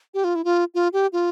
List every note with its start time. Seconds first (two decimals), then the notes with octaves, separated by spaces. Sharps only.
0.14 G4
0.24 F4
0.35 E4
0.44 F4
0.74 F4
0.93 G4
1.13 F4